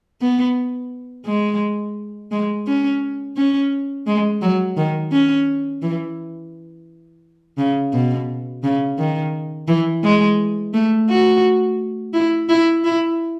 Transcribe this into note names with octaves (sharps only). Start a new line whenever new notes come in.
B3
G#3
G#3
C#4
C#4
G#3
F#3
D#3
C#4
E3
C#3
B2
C#3
D#3
E3
G#3
A3
F#4
E4
E4
E4